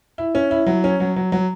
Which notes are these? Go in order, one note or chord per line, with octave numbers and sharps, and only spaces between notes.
E4
C#4
E4
F#3
C#4
F#3
F#3
F#3